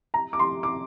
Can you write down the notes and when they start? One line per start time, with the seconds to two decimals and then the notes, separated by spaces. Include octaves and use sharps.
0.14 A#5
0.33 D6
0.39 C6
0.63 D6